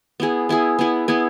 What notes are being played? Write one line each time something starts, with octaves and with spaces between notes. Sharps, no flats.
B3 E4 G#4
B3 E4 G#4
B3 E4 G#4
B3 E4 G#4